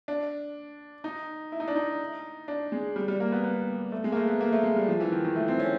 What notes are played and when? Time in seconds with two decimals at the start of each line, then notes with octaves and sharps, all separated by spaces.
0.08 D4
1.04 D#4
1.52 E4
1.60 D#4
1.68 D4
1.76 D#4
2.48 D4
2.72 G#3
2.96 G3
3.08 G3
3.20 A#3
3.32 B3
3.44 B3
3.92 A3
4.04 G#3
4.12 A#3
4.16 A3
4.28 B3
4.41 A#3
4.52 A3
4.64 G#3
4.76 G3
4.88 F3
5.00 E3
5.12 D#3
5.25 D#3
5.36 A3
5.48 C4
5.59 C#4